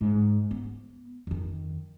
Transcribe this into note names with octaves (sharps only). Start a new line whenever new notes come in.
G#2
B3
F2 D#3